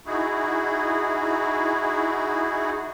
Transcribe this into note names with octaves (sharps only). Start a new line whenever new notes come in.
D#4 E4 F#4 G#4